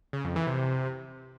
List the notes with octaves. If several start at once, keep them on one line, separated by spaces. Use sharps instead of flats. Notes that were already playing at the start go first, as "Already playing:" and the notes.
C#3
F2
E3
C3